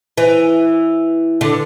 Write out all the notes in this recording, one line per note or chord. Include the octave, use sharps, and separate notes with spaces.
E3
D3